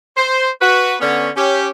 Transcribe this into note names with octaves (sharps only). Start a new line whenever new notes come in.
C5
F#4 B4
D3 B3 C#4
C#4 G4